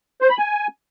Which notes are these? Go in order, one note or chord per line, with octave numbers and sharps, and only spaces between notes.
C5
B5
G#5